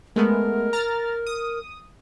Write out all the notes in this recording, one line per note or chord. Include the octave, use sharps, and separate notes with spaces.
G#3 A3 B3 A#4
A#5 F6 A6
D#6